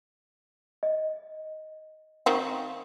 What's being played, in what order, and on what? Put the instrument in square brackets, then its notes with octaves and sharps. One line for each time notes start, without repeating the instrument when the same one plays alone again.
[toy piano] D#5
[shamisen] D#3 C4 F#4 [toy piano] F5